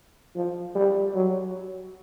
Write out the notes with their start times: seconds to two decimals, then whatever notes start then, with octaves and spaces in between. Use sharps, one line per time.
0.36 F3
0.75 G3
1.14 F#3